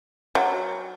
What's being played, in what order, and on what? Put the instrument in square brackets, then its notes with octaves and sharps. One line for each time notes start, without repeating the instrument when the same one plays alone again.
[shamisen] F#3